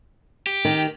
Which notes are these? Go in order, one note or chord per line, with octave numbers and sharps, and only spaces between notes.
G4
D#3